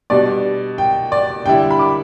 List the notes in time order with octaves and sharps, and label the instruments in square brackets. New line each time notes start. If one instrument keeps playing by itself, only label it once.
[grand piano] B2 G3 D4 [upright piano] D5
[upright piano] G5
D5
[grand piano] D3 G3 E4 [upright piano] G5
[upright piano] B5
D6